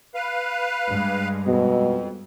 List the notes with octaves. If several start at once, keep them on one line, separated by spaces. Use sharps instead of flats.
B4 F5
G2 G#3
F2 B2